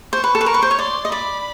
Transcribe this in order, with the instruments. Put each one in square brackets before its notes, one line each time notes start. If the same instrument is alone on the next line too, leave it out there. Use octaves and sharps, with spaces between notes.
[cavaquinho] C5 [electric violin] C#6
[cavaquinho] B4
A4
B4
[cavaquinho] A#4 [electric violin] C#6
[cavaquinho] B4
C5
C#5
[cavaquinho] D5 [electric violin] C6
[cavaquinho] D#5
[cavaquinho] D5 [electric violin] B5